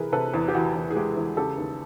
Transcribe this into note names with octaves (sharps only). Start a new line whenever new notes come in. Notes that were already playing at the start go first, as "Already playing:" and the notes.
Already playing: C3 E3 G#4 A#4 B4
C3 A4 B4
E2
G4
E3 F#4
E2
G#4
G#3 G4
E2
C#3 G4 A4
D#2